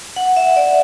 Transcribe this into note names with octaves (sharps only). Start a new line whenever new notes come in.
F#5
E5
D5